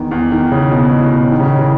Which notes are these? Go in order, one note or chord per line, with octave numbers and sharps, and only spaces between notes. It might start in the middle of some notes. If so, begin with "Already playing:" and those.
Already playing: E2 D#3
E2
D#3
C#3
B2
A2
B2
D#3
C#3
D#3
E3